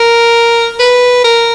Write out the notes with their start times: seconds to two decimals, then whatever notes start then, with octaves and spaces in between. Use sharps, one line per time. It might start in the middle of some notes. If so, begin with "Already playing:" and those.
Already playing: A#4
0.79 B4
1.24 A#4